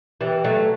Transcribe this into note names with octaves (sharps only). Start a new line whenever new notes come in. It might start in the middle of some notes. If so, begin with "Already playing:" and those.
E3 G3
F#3 A3